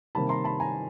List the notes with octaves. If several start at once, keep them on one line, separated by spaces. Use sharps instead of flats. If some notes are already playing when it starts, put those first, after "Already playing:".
C3 D#3 G3 A#3 A5 B5
A#5 C6
A5 B5
G#5 A#5